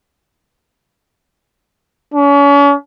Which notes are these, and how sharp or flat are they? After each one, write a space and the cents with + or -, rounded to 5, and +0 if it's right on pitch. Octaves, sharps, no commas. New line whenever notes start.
C#4 +40